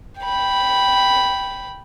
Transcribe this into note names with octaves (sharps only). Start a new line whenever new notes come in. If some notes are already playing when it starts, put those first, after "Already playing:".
G5 B5